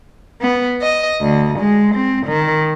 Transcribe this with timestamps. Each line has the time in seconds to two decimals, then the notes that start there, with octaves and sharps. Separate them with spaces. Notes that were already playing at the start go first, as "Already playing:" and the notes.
0.41 B3
0.82 D#5
1.21 D2
1.58 G#3
1.95 C4
2.27 D#3